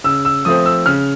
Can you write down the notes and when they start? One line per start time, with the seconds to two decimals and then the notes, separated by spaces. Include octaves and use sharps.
0.04 C#3 E6
0.25 E6
0.45 F3 A3 C4 D#6
0.66 E6
0.86 C#3 F6